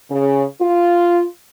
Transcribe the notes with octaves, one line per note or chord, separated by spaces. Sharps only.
C#3
F4